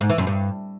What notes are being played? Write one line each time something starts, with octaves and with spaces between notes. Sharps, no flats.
G#2
E3
F#2
G2